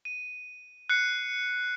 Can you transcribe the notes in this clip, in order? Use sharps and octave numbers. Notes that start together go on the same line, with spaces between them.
D#7
F#6 C7 C#7